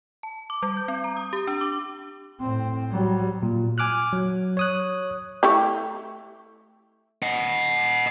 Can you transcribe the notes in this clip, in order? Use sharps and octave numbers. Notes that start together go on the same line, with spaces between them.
A5
D6
G3
G6
C4
A#5
D#6
G4
D4
D6
A2 C4
F#3 G3
A#2
G#5 D6 F6 F#6
F#3
C#5 D#6 F#6
A3 E4 G4
D#5 F#5